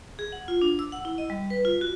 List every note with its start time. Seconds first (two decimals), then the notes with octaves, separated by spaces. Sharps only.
0.19 G#4
0.32 F#5
0.48 F4
0.62 D4
0.79 E6
0.92 F#5
1.05 E4
1.18 D#5
1.30 G3
1.50 B4
1.65 F4
1.81 F#4